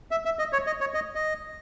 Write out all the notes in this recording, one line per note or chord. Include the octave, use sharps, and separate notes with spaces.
E5
E5
D#5
C#5
D#5
C#5
D#5
D#5